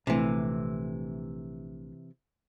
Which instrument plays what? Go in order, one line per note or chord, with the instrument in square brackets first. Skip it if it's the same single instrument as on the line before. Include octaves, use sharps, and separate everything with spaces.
[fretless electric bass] A#1 A3 [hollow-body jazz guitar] C3 E3